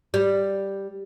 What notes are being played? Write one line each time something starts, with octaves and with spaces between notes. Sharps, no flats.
G3